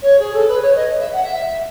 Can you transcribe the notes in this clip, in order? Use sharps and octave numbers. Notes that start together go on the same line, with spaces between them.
C#5
G#4
A4
B4
C#5
D#5
E5
F#5
E5